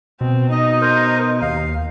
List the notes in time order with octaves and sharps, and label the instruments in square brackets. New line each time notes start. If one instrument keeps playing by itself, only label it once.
[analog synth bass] B2 [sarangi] C4
[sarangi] D#4 [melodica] D#5
[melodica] A#4 C5
[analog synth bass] D#2 [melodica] F5